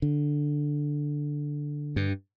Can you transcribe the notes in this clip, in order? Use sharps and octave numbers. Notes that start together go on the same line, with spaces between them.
D3
G2